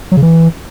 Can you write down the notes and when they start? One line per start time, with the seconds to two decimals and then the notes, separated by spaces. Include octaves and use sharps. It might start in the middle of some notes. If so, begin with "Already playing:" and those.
0.12 F#3
0.17 C#3
0.22 E3